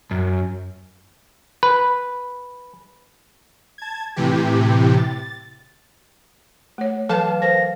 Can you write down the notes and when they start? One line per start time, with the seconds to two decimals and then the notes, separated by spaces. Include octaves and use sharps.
0.11 F#2
1.63 B4
3.78 A5 G#6
4.16 A2 C3 E3 G4
4.95 A6
6.78 A3 C#5
7.09 E3 F#3 A4 B4 F5 A5
7.42 A#4 C5 A#6